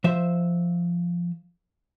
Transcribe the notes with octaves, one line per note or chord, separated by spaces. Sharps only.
F3 C5 E5